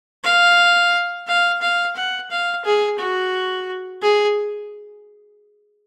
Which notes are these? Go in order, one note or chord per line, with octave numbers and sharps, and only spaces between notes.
F5
F5
F5
F#5
F5
G#4
F#4
G#4